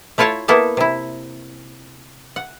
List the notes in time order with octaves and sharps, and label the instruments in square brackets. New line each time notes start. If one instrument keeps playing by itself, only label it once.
[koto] A3 E4 F4 C#5 A5
A#3 B3 E4 A4 A5
C3 E4
F#5